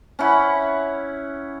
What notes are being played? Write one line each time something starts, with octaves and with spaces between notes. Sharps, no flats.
C#4 E4 F#5 B5